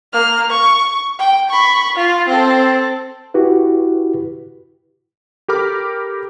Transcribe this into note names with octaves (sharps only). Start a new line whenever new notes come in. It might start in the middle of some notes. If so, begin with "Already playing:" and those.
A#3 F6
C#6
G5
B5 C#6
F4
C4 A4
E4 F#4 G4 B4
G4 A4 A#4 B5 D6 F6